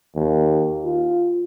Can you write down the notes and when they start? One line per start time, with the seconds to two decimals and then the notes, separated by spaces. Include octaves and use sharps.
0.15 D#2
0.84 F4